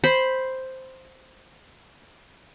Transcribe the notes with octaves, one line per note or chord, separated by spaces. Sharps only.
C5 B5